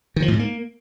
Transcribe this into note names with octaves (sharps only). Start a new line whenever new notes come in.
D#3
F3
A2
G#2
A#3